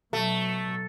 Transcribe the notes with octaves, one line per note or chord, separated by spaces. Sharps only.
B2 F#3 A3